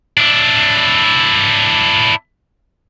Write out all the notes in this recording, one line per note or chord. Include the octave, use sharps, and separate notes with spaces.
D4 E4